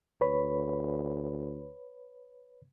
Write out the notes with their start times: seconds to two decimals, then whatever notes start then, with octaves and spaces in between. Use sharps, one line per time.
0.21 D2 B4 C#5 B5